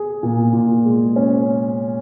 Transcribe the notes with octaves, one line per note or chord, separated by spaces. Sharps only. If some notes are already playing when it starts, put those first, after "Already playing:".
Already playing: G#4
A#2
A#2
G#3
C#4